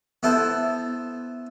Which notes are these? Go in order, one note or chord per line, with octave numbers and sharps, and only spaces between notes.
B3 E4 A4 C5